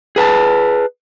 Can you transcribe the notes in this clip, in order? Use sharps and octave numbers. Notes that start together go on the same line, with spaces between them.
G#4 B4 G#5 A5